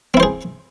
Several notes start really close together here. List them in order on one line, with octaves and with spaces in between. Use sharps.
C4 E4 C5 G#4